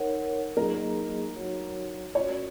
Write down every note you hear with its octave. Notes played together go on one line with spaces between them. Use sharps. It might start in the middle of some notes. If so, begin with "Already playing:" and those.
Already playing: D#4 A#4 C#5 F#5
F#3 A#3 D#4 G#4 A#4 D#5
F#3 D#4 F#4 C#5 F#5
C#4 F#4 A#4 C#5